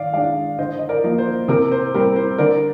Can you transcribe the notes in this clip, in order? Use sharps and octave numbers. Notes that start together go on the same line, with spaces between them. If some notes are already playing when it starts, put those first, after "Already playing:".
Already playing: D#3 D5 F5
G#3 D4 D5 F5
D3 C5 D#5
D#5
A#4 D5
F3 A#3 D#4
C5
C3 A#4
C5
G3 C4 A#4
C5
D3 A#4 D5